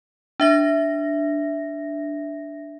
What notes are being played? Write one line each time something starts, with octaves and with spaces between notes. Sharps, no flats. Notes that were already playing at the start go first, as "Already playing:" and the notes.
D4 E5 A#6